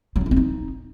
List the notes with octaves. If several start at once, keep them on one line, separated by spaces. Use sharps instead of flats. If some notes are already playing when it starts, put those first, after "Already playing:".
F#3
C#4
E4
C4
D#4